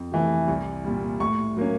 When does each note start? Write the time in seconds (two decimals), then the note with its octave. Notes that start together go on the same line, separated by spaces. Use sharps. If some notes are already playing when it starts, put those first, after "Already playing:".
Already playing: F2
0.11 C3 E3 A3
0.48 C2
0.84 A#2 G3
1.20 A2 C#6
1.57 F#3 A#3 C#4